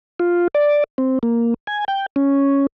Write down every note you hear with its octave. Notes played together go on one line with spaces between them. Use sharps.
F4
D5
C4
A#3
G#5
G5
C#4